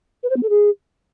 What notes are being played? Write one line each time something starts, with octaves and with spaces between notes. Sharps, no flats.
B4
C5
B3
A4
G#4